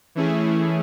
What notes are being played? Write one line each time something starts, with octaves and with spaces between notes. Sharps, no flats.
E3 A3 C#4 E4 G#4